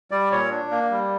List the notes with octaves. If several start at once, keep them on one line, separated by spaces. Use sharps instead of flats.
G3 D5
A#2 C#5
D4
A#3
G3